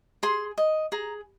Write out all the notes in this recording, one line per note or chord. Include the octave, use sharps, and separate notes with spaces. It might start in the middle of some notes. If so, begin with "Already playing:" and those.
G#4 C6
D#5
G#4 A#5